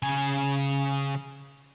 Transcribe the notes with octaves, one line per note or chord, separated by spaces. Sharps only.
C#3 G#5